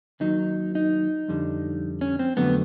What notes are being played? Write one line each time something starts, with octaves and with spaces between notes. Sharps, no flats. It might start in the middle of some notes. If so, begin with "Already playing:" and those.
D#2 D#3 F#3 D#4
D#4
F2 D3 G3
C#4
C4
F2 D3 F#3 A3 B3